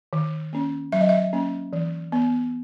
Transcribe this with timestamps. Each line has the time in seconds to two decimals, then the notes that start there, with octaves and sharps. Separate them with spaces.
0.13 D#3
0.53 A#3 C#4
0.92 F#3 E5
1.01 D#5
1.09 E5
1.33 A#3 C#4
1.73 E3
2.12 B3